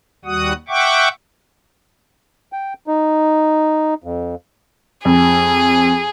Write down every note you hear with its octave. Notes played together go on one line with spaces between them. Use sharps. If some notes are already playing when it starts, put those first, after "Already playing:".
D#2 G3 F#4 F#5 D#6
E5 F#5 G5 C#6 D6
G5
D#4
F2
F2 G#4